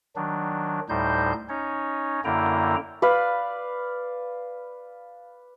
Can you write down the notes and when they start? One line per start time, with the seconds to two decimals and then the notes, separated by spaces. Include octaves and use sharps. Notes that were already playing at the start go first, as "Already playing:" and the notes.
0.16 D#3 F#3 D4
0.89 D2 A2 G3 D#4 C5 G6
1.49 C#4 D#4 C#5
2.25 F#2 D3 A#3 E4 G5 A#5
3.02 B4 D5 F5 B5